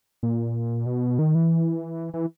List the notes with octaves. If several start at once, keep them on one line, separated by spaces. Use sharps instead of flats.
A#2
B2
D#3
E3
E3